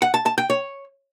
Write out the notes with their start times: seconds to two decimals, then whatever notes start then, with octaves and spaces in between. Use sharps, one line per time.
0.02 F#5
0.14 A5
0.26 A5
0.38 G5
0.50 C#5